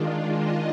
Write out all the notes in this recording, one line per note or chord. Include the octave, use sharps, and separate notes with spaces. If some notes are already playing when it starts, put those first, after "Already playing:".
Already playing: D#3 G#3 D4 F4
D#5